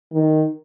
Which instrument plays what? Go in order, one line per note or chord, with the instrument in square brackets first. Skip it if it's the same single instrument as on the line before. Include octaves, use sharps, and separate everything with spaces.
[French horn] D#3